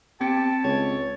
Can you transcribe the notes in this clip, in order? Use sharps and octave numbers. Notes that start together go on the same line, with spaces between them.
C4 G4 A5 G#6 C#7
C#2 C#5